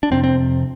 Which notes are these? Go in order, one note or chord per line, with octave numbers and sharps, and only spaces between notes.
D4
F2 C3 C4
C4